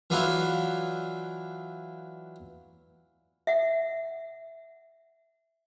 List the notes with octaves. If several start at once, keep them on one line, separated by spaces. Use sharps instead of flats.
E3 F#3 D4 E4 F4 A4
E5 F#5